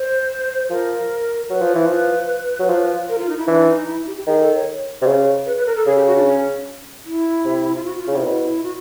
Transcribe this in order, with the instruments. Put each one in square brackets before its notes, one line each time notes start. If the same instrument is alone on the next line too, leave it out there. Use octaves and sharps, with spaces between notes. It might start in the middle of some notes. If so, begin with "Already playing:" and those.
Already playing: [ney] C5
[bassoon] F3 [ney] A#4
[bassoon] F#3 [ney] B4
[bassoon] F3
E3
F3
F#3
F3
[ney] A#4
F4
D#4
E4
[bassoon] E3 [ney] D4
[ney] D#4
E4
G4
G4
[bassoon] D#3 [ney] G#4
[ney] A4
C#5
[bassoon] C3
C#3
[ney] B4
B4
A#4
A4
[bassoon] C#3 [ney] G#4
[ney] G4
F#4
D4
C#4
E4
[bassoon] C3
[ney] F4
F#4
F4
[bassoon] C#3
[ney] E4
[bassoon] C3
[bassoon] B2 [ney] E4
[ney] E4
F#4